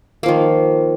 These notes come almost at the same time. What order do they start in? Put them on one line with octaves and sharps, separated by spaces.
A#3 F3 D#3